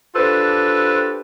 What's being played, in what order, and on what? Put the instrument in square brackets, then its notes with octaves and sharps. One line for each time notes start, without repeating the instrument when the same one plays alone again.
[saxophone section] D4 F4 G4 A4 B4 C5